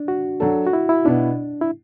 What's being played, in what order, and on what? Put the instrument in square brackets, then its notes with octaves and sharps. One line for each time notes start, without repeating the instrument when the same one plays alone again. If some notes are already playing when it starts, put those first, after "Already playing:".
Already playing: [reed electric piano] D4
F#4
[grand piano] F#3 D4 A4
[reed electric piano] F#4
E4
E4
[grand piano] B2 B3 E4 [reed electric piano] D4
[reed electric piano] E4